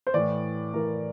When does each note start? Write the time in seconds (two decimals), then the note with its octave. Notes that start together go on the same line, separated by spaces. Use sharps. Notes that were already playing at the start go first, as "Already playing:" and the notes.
0.07 C5
0.14 A2 E3 D5
0.73 A2 E3 A#4